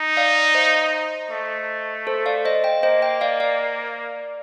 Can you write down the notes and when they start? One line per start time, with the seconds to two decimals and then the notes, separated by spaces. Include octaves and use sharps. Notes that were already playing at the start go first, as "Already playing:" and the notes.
Already playing: D#4
0.17 D5 F5
0.54 C5 D#5
1.31 A3
2.07 A4 C5
2.26 D5 F5
2.45 C5 D#5
2.64 D#5 G5
2.83 A#3 C5 D#5
3.02 D#5 G5
3.21 D5 F5
3.40 D5 F5